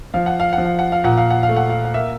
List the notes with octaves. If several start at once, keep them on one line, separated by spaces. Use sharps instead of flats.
F3 F5
F#5
F5
F#5
F3
F5
F#5
F5
A#2 F#5
F5
F#5
F5
A3
F#5
F5
F5
A#3 E5